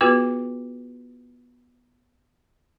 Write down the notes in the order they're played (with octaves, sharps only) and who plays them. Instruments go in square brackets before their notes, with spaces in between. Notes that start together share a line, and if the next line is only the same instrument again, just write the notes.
[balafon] B3 F4 F#4 G#4 B4 D6